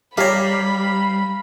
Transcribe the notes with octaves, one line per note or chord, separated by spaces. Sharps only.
G3 G4 C#5 F5 A#5 B5